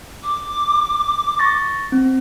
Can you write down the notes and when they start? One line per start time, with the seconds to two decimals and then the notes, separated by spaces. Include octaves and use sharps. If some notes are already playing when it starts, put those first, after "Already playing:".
0.23 D6
1.39 C#6 A6 A#6
1.92 C4